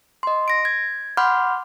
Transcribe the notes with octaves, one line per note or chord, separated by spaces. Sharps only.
D#5 C6
A#6 D7
G#6
F#5 B5 C6 D6 F6 G6